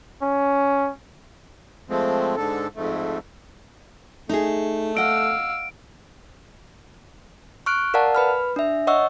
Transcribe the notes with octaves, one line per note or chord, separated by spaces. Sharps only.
C#4
F3 G#3 A3 C4
G#2 D3 A4
F2 G#2 A3
A3 D#4 G#4
D#5 F5 F#5 E6 D7
C#6 F6 F#6 D7
A#4 D5 F5 F#5 A5
B4 B5 F6
D4 E5
C#5 D#5 F#5 C#6 E6